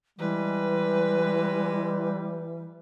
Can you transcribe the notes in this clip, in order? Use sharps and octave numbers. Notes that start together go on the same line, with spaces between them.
E3 G3 G#3 B4